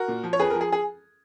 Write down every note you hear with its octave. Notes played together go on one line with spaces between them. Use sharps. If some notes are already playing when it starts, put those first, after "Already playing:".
Already playing: F#4 A#4
A#2
F3
C#5
F2 G#4 B4
A#4
F3
G#4
G#4